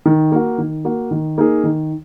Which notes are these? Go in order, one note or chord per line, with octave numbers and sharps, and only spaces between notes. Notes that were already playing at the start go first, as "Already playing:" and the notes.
D#3
A#3 F#4
D#3
A#3 F#4
D#3
A#3 D#4 G#4
D#3